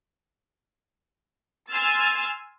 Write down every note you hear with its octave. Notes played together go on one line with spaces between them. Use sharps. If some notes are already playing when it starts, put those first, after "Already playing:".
G#5 C6 E6 F6 A6